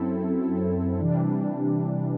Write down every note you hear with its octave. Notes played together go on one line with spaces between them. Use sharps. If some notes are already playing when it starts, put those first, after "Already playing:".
Already playing: F#2 F#3 C4 E4 A4
C3 E3 G3 D4